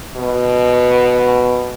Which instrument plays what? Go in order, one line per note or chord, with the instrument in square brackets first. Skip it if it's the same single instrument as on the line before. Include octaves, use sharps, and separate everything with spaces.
[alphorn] B2